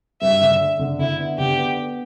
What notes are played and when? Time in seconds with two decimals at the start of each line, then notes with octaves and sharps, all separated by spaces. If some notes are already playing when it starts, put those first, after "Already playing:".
0.21 G2 E5
0.41 D3
0.60 A3
0.79 D3
0.99 D3 E4
1.19 B3
1.38 D3 G4
1.57 B3
1.76 B3